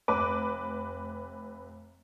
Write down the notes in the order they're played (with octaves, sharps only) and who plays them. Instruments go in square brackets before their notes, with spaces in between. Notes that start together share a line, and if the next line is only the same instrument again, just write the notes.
[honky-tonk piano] F1 B4 D6